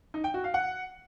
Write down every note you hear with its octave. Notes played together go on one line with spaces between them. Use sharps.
D#4
G5
F#4
F5
F#5